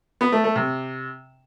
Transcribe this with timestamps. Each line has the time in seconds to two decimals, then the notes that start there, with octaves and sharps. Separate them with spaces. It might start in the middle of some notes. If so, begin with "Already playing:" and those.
0.21 B3
0.32 A3
0.44 A3
0.56 C3